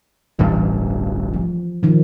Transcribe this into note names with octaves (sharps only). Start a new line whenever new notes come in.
D1 A1 G2 E3
F3
D#3 F3